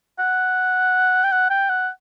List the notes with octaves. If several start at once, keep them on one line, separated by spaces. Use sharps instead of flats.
F#5
G5
F#5
G5
F#5